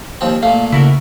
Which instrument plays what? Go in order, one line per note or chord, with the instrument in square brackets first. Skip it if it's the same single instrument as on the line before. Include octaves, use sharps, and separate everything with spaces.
[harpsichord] D#2 F3 C4
[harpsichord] A#2 A3 [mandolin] F5
[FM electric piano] C#3 [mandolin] E4 F#4 A#4